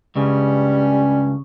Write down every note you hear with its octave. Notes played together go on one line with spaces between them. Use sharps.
C#2 G2 C#3 G3 C#4